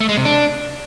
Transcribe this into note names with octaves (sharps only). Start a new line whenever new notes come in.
A3
G#3
C3
D4